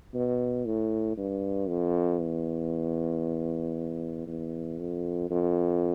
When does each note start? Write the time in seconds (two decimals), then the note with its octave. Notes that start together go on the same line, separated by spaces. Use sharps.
0.14 B2
0.66 A2
1.18 G2
1.68 F2
2.20 E2
4.27 E2
4.79 F2
5.31 F2